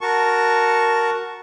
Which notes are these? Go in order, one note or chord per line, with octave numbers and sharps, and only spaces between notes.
F#4 A#4 A5 C#6